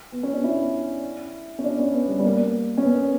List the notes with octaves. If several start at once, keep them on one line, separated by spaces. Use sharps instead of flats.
B3
C#4
D4
E4
C#4
D4
C#4
B3
G3
G3
A#3
C#4
B3